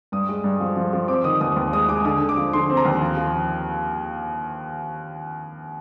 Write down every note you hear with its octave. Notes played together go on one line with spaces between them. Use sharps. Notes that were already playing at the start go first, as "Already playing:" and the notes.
G2 D#6
G#3
G2
F3
F3
F3
C4 D6
D#3 D#6
D#2 D#6
D#2
G#3 D#6
G#3 D6
D3 D#6
D3
D6
F3
D3 C6
C4
A#5
D#2
F3
F3